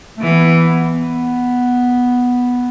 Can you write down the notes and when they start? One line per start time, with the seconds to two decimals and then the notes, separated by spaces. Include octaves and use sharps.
0.17 A3
0.23 E3 B3
0.54 B3
0.84 B3